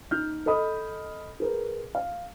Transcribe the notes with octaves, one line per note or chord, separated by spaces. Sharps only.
D#4 F6 G6
A4 D#5 B5 D#6
G#4 A#4 B4
F5